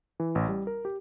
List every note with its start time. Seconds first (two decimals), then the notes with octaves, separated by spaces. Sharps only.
0.20 E3
0.35 A1
0.48 G3
0.67 A#4
0.85 G4